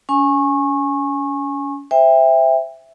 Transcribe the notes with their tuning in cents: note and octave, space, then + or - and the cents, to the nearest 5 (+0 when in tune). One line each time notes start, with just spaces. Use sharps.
C#4 +35 G#5 +0 C#6 -25
C5 +0 E5 +0 G5 +35